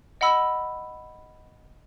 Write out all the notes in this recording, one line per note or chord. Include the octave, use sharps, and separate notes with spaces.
D#5 F#5 B5 E6